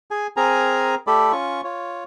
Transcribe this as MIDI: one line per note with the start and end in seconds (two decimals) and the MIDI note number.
0.11 0.27 68
0.11 0.27 80
0.37 0.95 60
0.37 0.95 68
0.37 0.95 70
0.37 0.95 80
0.37 0.95 82
1.07 1.32 57
1.07 1.32 67
1.07 1.32 69
1.07 1.32 74
1.07 1.32 83
1.32 1.61 61
1.32 1.61 65
1.32 1.61 85
1.64 2.04 65
1.64 2.04 73